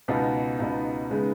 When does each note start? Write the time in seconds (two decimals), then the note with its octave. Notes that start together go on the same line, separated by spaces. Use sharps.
0.08 C#2 B2 B3 D#4
0.59 C#2 B2 B3 D#4
1.10 C#3 G#3 B3 D#4